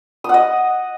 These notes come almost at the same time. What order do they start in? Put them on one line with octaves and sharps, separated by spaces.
D#6 F#5 D#5